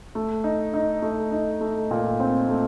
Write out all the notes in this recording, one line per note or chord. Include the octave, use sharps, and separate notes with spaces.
A3
D#4
D#4
A3
D#4
A3
A#2
C4
A3